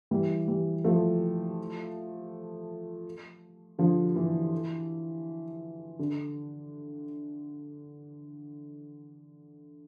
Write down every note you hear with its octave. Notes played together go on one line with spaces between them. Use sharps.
E3 G3
E3 G3
F3 A3
D3 F3
E3
D3